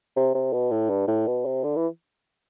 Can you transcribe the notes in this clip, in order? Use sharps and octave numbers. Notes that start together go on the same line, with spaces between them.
C3
C3
B2
A2
G2
A2
B2
C3
D3
E3